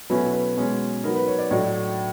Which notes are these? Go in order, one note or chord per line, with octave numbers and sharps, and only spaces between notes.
B2 F#3 A3 C#4 E4 B4
B4
B2 G#3 C#4
F#3 B3 D#4 A#4
B4
C#5
D5
A2 F#3 A3 D4 D#5